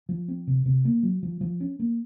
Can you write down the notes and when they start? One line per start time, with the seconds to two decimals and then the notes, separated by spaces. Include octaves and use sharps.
0.09 F3
0.28 C4
0.47 C3
0.66 C3
0.85 A#3
1.03 F#3
1.23 F3
1.41 F3
1.60 C#4
1.79 A#3